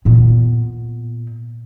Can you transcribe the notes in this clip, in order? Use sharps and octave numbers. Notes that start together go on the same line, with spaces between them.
A#2 B3